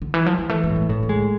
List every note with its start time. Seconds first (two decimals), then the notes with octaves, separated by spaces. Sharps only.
0.02 D3
0.14 E3
0.26 F3
0.38 G#3
0.49 E3 A3
0.64 A3
0.70 A2
0.76 G#3
0.89 A2 F3
1.03 E3
1.09 G#3
1.16 D3